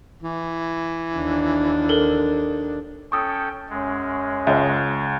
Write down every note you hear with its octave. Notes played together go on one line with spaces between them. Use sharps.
E3
D#2 D4
A4 A#4
C#4 A4 G5 C#6 D#6 E6
F#2 G#3 C#4
C#2 C#5 D#5 E5